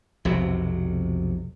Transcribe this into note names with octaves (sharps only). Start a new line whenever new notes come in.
B1 F2 C3 F#3